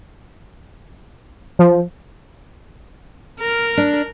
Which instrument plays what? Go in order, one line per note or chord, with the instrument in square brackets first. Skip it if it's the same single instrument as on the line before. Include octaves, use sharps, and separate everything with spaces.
[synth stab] F3
[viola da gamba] A#4
[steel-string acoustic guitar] D4